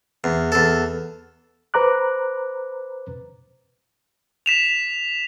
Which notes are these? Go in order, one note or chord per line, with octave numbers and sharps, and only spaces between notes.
E2
E2 A4
B4 C5 A#5 D6 F#6
B6 E7 F7